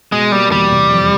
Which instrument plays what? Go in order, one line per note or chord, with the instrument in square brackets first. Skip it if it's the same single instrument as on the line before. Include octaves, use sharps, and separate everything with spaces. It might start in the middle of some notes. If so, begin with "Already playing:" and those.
[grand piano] B2 [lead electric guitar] G#3
[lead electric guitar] G3 [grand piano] A#3
[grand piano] E2 [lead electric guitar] G3
[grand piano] C3
F2